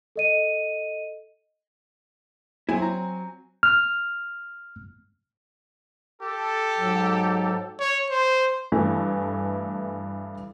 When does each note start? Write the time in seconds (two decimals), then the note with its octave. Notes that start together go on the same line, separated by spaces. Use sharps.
0.16 A4 D#5 D#7
2.69 F#3 C4 E4 G#5
2.82 A#5
3.63 F6
6.22 G4 A4
6.78 G#2 F#3
7.80 C#5
8.10 C5
8.72 G2 E3 A3 E4